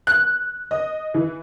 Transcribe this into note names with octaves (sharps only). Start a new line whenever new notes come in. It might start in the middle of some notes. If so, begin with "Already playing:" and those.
F#6
D#5
E3